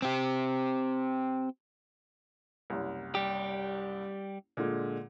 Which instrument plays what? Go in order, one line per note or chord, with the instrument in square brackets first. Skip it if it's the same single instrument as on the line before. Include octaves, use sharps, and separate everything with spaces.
[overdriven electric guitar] C4 G4
[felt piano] F#1 C2
[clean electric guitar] G3 G4
[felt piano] A#2 D3 G#3